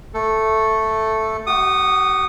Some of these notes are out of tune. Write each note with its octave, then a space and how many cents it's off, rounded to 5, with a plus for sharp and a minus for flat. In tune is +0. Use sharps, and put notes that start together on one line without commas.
A3 +0 A4 +0
G4 -45 F#5 +0 D#6 -15